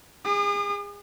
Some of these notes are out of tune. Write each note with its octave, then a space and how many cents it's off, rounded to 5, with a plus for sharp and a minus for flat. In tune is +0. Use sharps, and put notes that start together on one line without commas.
G#4 -35 D#6 -45